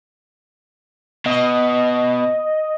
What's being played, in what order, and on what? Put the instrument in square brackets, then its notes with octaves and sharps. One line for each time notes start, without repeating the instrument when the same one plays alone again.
[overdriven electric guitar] B2 [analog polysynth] D#5